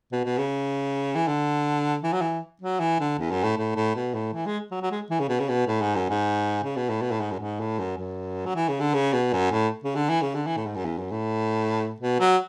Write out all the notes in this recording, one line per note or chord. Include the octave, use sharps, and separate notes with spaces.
B2
B2
C#3
E3
D3
E3
F#3
E3
F#3
E3
D3
E2
F#2
A2
A2
A2
B2
A2
E3
G#3
F#3
F#3
G#3
E3
C#3
B2
C#3
B2
A2
G#2
F#2
G#2
C#3
B2
A2
B2
A2
G#2
F#2
G#2
A2
F#2
F#2
F#3
E3
C#3
D3
C#3
B2
F#2
A2
C#3
D3
E3
C#3
D3
E3
A2
G#2
F#2
E2
F#2
A2
B2
F#3